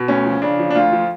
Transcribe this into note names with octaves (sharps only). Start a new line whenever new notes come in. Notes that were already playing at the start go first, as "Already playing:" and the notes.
Already playing: B2
D2 C#4
F3
C#3 D4
F3
D4
D2 F4
F3